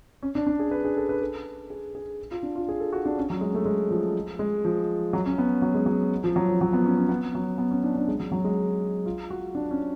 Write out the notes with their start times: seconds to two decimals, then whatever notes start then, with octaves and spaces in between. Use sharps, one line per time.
0.23 C#4
0.35 D4
0.47 D4
0.60 G#4
0.71 B4
0.85 G#4
0.97 A4
1.09 B4
1.21 A4
1.70 G#4
1.95 G#4
2.31 F4
2.43 D4
2.56 F4
2.69 G#4
2.80 A4
2.93 F#4
3.05 D4
3.18 C#4
3.30 F#3
3.41 G#3
3.54 A3
3.66 G#3
3.91 F3
4.39 G#3
4.65 F3
5.13 F#3
5.26 C#4
5.38 B3
5.62 F#3
5.74 G#3
5.86 F#3
6.24 F3
6.36 F#3
6.48 F3
6.61 F#3
6.73 B3
6.86 C#4
6.97 C#4
7.09 B3
7.35 F#3
7.58 B3
7.71 C#4
7.83 D4
7.95 D4
8.08 G#3
8.20 F#3
8.32 F#3
8.45 G#3
9.06 F4
9.30 F#4
9.55 D4
9.71 C#4